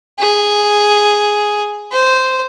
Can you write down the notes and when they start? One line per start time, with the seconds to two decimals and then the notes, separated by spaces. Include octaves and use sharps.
0.19 G#4
1.92 C5